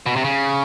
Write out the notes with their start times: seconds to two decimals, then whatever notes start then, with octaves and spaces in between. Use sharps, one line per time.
0.06 B2
0.16 C3
0.24 C#3